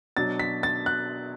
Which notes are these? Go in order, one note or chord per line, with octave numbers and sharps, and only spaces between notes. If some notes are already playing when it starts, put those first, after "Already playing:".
B2 F#3 D4 A6
B6
A6
F#6